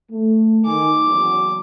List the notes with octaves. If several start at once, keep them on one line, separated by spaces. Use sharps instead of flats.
A3
D#3 G#5 D6
F#1 E2 F#3